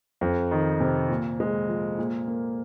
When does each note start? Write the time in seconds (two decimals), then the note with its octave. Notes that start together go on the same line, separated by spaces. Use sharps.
0.21 F2
0.51 D#3
0.81 C3
1.09 A#2
1.40 G#3
1.69 F3
1.98 A#2
2.27 A#3